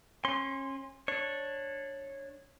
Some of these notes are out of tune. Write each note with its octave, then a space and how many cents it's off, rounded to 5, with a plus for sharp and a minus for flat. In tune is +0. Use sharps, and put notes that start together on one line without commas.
C#4 -30 C6 +0
D4 +0 C#5 -15